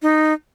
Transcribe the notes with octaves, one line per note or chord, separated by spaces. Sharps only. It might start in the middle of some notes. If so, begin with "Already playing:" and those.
D#4